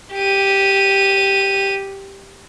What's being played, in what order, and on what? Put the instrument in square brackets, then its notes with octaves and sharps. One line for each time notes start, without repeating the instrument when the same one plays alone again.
[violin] G4 D#7